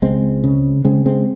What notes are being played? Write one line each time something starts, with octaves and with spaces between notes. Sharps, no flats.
C#2 G#3 C4
C#3
C#3 G#3 C4
G#3 C4